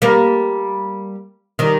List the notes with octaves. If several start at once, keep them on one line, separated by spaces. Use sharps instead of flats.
G3 A#3
D#3 G3